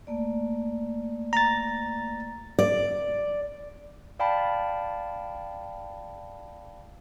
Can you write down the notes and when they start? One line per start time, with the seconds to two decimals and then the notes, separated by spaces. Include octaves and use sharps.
0.07 A3 A#3 D5
1.33 A#5 A6
2.59 D5
4.19 D5 F5 G5 A5 B5